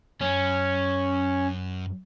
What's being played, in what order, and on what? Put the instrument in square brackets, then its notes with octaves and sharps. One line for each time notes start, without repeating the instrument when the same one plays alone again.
[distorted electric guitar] F#2 [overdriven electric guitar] C#4